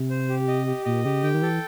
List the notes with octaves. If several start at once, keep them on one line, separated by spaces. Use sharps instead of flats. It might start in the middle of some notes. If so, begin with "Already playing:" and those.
Already playing: C3
C5
G4
D#5
G4
A#2 D#5
C#3 G4
D3 G5
D#3
E3 A4